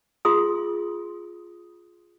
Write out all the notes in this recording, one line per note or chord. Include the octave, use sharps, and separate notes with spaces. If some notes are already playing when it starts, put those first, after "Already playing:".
F4 G#4 C6 D#6